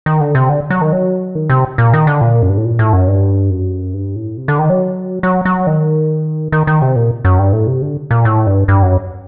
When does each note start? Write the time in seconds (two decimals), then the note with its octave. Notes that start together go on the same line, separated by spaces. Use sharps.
0.06 D#3
0.21 D3
0.35 C3
0.49 D3
0.70 F#3
0.81 D#3
0.92 F#3
1.35 D#3
1.50 C3
1.78 A#2
1.93 D#3
2.07 D3
2.21 A#2
2.42 F#2
2.49 G2
2.57 A2
2.65 A#2
2.79 A2
2.93 F#2
3.08 G2
3.50 F#2
3.94 G2
4.16 A2
4.37 C3
4.48 D3
4.59 D#3
4.70 F#3
5.23 F#3
5.45 F#3
5.67 D#3
6.52 D#3
6.67 D#3
6.82 C3
6.96 A#2
7.25 F#2
7.39 G2
7.53 A2
7.67 C3
7.82 D3
8.11 A#2
8.25 A2
8.47 G2
8.68 G2
8.82 F#2